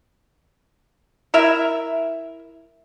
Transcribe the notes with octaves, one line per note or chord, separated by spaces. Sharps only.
E4 A#4 E5